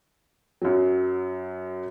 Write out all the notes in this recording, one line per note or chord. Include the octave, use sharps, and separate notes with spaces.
F#2 F#3